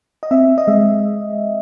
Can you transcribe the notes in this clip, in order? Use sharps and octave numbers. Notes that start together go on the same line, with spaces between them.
D#5
C4 E5
D#5
G#3 E5